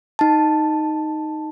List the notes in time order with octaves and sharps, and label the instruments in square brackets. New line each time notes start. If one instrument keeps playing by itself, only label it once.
[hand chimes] D#4 A5